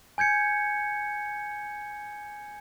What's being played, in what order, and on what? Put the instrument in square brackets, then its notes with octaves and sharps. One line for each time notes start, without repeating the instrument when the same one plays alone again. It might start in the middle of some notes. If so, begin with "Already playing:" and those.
[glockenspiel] G#5 G6 G#6 C#7